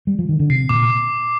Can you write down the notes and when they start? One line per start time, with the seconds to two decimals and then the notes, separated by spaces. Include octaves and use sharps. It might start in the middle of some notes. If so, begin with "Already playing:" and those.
0.07 G3
0.19 F3
0.29 D#3
0.39 D3
0.49 C3 C7
0.69 A#2 D6